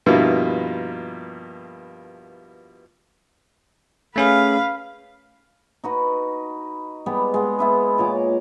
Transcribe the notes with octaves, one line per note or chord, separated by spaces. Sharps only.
G2 B2 F3 A#3 E4 F4
A3 C#4 G#4 B4 F5
D#4 F#4 B4
G3 G#3 B3 G4
G#3 B3
B3 E4 B4
A#2 C#5 D#5 D6